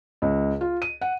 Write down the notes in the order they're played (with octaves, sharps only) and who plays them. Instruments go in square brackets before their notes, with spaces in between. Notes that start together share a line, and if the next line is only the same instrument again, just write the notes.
[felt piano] C#2
F4
D#7
F#5